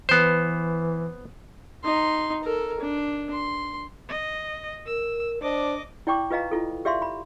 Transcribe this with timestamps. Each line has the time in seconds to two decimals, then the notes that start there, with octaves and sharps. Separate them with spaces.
0.09 E3 B3 C5
1.84 D#4 C6
2.44 A4 A#4
2.80 D4
3.32 C6
4.09 D#5
4.86 A#4 E6
5.42 D4 C5 D#5 D6
6.07 E4 D5 G5 C#6 D6
6.30 F4 B4 D#5 F5 A#5
6.51 E4 F4 A4
6.85 G4 D5 E5 F5 C6
7.02 B5